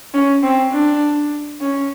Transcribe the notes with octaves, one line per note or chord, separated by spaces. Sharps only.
C#4
C4
D4
C#4